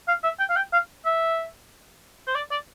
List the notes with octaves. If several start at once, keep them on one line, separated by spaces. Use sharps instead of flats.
F5
E5
G5
F5
G5
F5
E5
C5
D5
D5